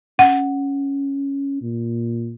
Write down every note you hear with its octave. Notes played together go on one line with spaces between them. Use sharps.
C#4 F#5
A#2